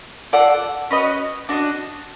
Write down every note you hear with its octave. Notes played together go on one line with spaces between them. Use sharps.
F4 A4 D5 F#5
C#4 F#4 B4 D#5
D4 F#4 B4 D#5